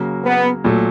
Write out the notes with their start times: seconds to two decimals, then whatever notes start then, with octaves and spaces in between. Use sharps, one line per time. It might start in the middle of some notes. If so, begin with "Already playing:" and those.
Already playing: C#3 F#3 A#3
0.25 B3
0.64 A#2 F#3 A3